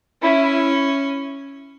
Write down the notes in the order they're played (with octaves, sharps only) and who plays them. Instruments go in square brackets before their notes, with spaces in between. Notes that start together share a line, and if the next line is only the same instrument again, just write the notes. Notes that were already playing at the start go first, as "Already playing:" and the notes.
[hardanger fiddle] C#4 [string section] E4